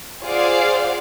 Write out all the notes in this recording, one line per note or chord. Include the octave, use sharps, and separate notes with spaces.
F4 G#4 C5 D5 F5 F#5